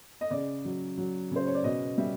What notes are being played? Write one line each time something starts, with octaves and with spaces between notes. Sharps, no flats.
D#5
C#3 D5
F#3
F#3
C#3 C5
C#5
D5
B2 D#5
G3 E5